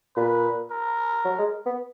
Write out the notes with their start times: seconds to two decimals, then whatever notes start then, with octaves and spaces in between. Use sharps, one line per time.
0.16 A#2 B4
0.71 A#4
1.25 F#3
1.39 G#3
1.66 B3